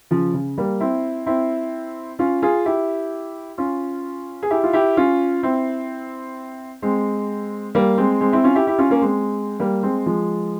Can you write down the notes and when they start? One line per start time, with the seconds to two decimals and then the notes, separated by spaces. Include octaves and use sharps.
0.11 C#3 F3
0.34 C#3
0.58 G3 A#3
0.80 C4 E4
1.26 C4 E4
2.19 C#4 F4
2.42 F4 G#4
2.65 E4 G4
3.58 C#4 F4
4.43 G#4
4.50 E4 G4
4.64 F4
4.73 E4 G4
4.97 C#4 F4
5.43 C4 E4
6.82 G#3 C4
7.75 G3 A#3
7.98 G#3 C4
8.21 G#3 C4
8.32 C4 E4
8.44 C#4 F4
8.55 E4 G4
8.67 E4 G4
8.78 C#4 F4
8.90 A#3 C#4
9.02 G#3 C4
9.60 G3 A#3
9.83 G#3 C4
10.06 F3 G#3